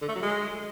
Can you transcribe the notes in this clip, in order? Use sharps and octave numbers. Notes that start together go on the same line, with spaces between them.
D3
A3
F#3
G#3